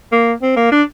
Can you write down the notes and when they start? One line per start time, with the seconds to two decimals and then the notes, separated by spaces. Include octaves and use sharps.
0.12 A#3
0.42 C4
0.56 A#3
0.72 D4